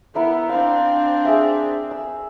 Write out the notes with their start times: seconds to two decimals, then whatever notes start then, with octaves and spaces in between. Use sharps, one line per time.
0.15 B3 E4 A#4 E5
0.49 C4 D4 F5
1.25 G#4 E5
1.91 E6